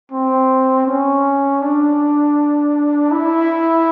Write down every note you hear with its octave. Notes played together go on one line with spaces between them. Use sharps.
C4
C#4
D4
E4